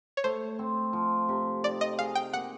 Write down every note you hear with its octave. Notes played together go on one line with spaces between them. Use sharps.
C#5
A3 C5
C4
F3
C3
D#4 D5
D#5
G#4 F5
G5
A#3 F#5